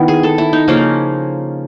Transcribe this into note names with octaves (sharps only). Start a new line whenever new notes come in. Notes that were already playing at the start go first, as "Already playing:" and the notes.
Already playing: D#3 B3 E4
G#4
A4
E4
D#4
C#3 F3 A#3 C#4